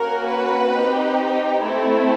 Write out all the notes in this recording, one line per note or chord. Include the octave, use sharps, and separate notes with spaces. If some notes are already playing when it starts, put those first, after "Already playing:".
Already playing: A#3 C#4 F#4 A#4
B4
C4 D#4 G4
A3 C4 E4